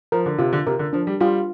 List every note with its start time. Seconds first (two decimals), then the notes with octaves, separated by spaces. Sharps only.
0.12 F3 A#4
0.26 D3
0.38 C3 F4
0.53 D3
0.66 C3 A#4
0.79 D3
0.93 F3 D4
1.07 G3
1.20 G3 F4